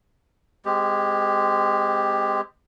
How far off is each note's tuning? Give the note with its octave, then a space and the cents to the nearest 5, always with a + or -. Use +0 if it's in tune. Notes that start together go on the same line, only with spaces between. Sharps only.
G#3 -10 C4 -25 G4 +5